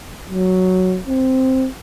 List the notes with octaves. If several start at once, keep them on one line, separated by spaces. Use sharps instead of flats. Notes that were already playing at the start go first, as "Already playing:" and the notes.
F#3
C4